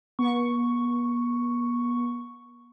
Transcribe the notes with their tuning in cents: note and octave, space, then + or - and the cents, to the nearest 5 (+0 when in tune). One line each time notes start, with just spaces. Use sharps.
B3 -40 C#6 +0